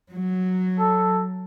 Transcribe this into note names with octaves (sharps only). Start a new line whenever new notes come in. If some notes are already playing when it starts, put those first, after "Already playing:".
F#3
A4